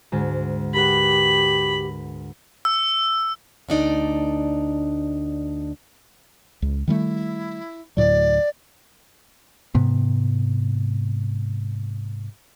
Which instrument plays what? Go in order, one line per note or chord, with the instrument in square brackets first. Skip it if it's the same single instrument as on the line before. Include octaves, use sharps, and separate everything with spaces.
[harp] D2 G#2
[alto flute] G4 [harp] A#4 B4 F#5 [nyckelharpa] B5
[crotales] E6
[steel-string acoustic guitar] D2 D4 D#4 D5
[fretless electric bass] C#2
[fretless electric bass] D#3 G3 A3 [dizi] E4
[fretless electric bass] D2 A2 F#3 [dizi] D5
[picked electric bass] G#2 C3 B3